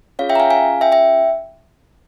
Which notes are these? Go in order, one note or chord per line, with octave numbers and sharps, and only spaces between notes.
C#4 F4 G#4 C#5 F5
E5 G5
A#5
F5 G#5
F5 G#5
E5 G5
E5 G5